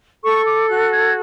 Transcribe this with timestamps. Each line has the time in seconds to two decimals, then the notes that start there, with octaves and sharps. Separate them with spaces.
0.23 A4 C#6
0.47 D6
0.69 F#4 F#6
0.93 G#6